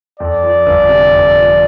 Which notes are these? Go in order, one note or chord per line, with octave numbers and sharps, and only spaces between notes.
F2 D5
F3
G1
C3
F2
F3